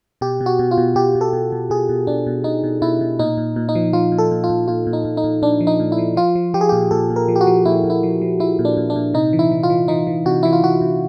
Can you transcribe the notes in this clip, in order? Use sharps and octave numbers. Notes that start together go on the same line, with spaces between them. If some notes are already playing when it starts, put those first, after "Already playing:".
B2 G4
B2
F#4
B2
F4
B2
B2 G4
B2
A4
B2
B2
B2 G#4
B2
B2 D4
B2
B2 D#4
B2
B2 E4
B2
A#2 D#4
A#2
A#2
D#4
F3
F3 F4
A#2
A4
A#2
F4
A#2
A#2 F4
A#2
D#4
A#2
D#4
A#2
A#2 D4
F3
D#4
A#2
E4
F3
F3 F4
F3
F3 G4
G#4
A#2 G4
A#2 A4
A#2
A#4
F3
G4
F#4
F3
A#2 E4
A#2
E4
F3
F3
F3 E4
A#2
D4
A#2
D4
A#2
C3 D#4
E3
E4
E3
F4
E3
E3 D#4
E3
C3 F#4
E3 E4
F4
E3 F#4
C3